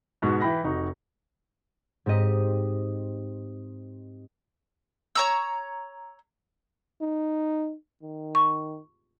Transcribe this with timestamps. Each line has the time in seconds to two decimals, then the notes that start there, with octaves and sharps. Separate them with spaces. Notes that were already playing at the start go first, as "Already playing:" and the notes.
0.22 G#2 B2 F#4
0.40 E3 G5 B5 A#6
0.64 F1 D#4 F#4
2.06 G#2 C4 G4 D#5 B6
5.15 C#5 A#5 E6
7.01 D#4
8.02 D#3
8.35 C#6